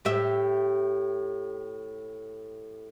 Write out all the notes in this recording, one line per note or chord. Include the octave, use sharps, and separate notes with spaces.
A2 G4 E5